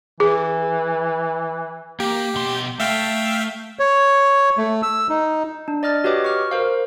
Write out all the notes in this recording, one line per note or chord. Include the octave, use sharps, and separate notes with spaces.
E3 G#4
A#3 G4
B2 C6
A3 E5 F5 G5
C#5
A3
E6
D#4
D4
D5 D#5 F6 A6
F#4 G4 B4 C#5 D#5 D6
C#6 F6
A#4 C5 F5